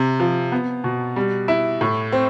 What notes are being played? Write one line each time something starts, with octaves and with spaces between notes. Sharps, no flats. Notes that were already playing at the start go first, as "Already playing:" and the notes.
Already playing: C3
F3
B3
B2
G3
E4
A2
C4